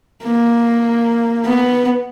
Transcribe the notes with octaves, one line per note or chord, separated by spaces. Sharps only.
A#3
B3